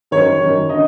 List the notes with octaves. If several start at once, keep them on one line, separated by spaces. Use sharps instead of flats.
F#2 D#3 C#5
F#2 D#3
D3 D#5